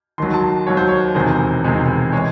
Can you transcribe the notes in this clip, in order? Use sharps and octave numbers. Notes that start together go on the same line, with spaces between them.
D#2 D#3 F#3 C6
A5
D#2 D#3 F#3 C#5
C5
C#5
E1 E2 C3 D#3 G#3 C5
E1 E2 C3 D#3 G#3
E3 G#3 C#5